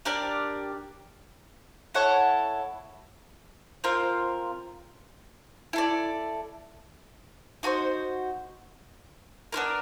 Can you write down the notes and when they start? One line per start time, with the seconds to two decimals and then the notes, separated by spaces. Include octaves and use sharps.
0.05 D4 G4 A#4 D5
1.94 E4 A4 C#5 F#5
3.84 C4 F4 A#4
5.73 E4 A4 D5
7.63 D#4 F#4 A4 C5
9.52 B3 D4 F4 A#4